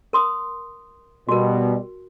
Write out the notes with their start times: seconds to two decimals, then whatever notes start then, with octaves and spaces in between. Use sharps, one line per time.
0.13 A#4 C6 D#6
1.29 B2 G3 F#4 A#4